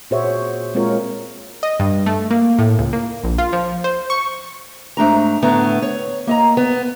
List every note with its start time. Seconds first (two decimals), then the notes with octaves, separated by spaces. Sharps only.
0.11 A#2 F#4 G#4 C5 C#5 E5
0.75 G#3 A#3 C4 F4 A#4 C#5
1.63 D#5
1.80 G2
2.06 A3
2.31 A#3
2.59 A2
2.78 C#2
2.93 A#3
3.24 A#1
3.38 F4
3.53 F3
3.84 C5
4.10 C#6
4.97 G#2 A3 D4 A#5
5.42 A2 D3 A3 B3 A#5
5.82 C#5
6.27 A#3 D#5 A#5
6.57 B3